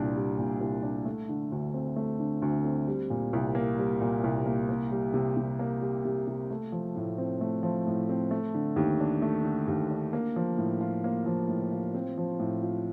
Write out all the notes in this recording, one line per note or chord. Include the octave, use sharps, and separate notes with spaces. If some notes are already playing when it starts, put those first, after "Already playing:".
Already playing: C2 A#2 G3 D4
G3
A#2
C2
D4
A3
D3
D2
C4
A3
D3
D2
C4
G3
A#2
C2
A#3
G3
A#2
C2
A#3
A#3
G3
C3
C3
A#3
G3
C3
C3
A3
F3
A2
C4
A3
F3
A2
C4
A3
D3
D#2
D4
A3
D3
D#2
D4
A#3
F3
A2
F4
A#3
F3
A2
F4
C4
F3
A2
F4